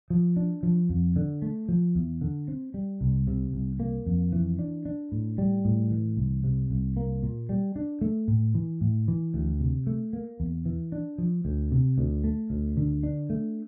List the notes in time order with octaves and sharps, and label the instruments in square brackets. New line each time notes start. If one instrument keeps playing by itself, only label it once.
[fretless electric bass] F3
D4
F3
F2
D3
A3
F3
E2
D3
C4
G3
C2
C3
C2
A#3
F2
E3
D4
D4
A2
G3
A2
E3
C2
C3
C2
A#3
A#2
G3
D4
A3
A2
E3
A2
E3
D2
C3
A3
A#3
E2
E3
D4
F3
D2
C3
D2
A3
D2
D3
D4
A3